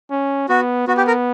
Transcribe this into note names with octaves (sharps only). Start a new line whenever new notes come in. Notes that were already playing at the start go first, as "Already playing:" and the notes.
C#4
B3 F#4
B3 F#4
G4
A#4